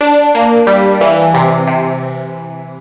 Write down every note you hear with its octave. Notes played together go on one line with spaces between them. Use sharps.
D4
A#3
G3
E3
C3
C3